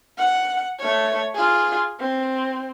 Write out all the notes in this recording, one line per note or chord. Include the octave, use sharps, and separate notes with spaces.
F#5
A3 C#5
F4 G#4
C4